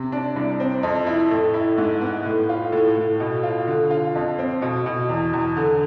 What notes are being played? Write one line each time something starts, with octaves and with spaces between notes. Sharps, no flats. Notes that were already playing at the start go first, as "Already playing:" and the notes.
Already playing: C3
D4
C2
C4
F2
E4
A2
E4
G#2
B3
A2
F4
A2
A2
B2
F4
D3
F4
F2
C4
B2
B2
E2
E2
D3